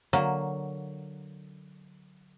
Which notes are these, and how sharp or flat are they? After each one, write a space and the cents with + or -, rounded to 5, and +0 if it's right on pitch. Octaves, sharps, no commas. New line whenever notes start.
D3 +0 F#3 +0 A#3 +0